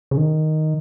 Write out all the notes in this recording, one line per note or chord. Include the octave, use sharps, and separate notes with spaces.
C#3
D#3